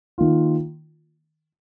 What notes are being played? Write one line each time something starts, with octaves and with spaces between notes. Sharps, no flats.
D#3 A#3 F4